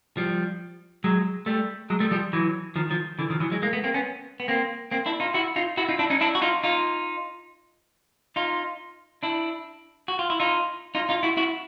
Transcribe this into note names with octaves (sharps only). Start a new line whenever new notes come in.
F3 G3
F#3 G#3
G3 A3
F#3 G#3
G3 A3
F3 G3
E3 F#3
D#3 F3
D#3 F3
D3 E3
D#3 F3
E3 F#3
F#3 G#3
G#3 A#3
A3 B3
A#3 C4
B3 C#4
B3
A#3 C4
A#3 C4
D4 E4
D#4 F4
E4 F#4
D#4 F4
E4 F#4
D#4 F4
D4 E4
C#4 D#4
D4 E4
F#4
D#4 F4
D#4 F4
D#4 F4
D4 E4
F#4
F4
E4
D#4 F4
D#4 F4
D#4 F4
E4 F#4
E4 F#4